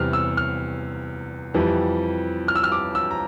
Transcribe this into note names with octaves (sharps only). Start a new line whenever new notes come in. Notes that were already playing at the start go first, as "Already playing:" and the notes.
Already playing: E2 C3 G3 F6
E6
F6
F2 E3 G3
F6
E6
F6
D6
E6
A#5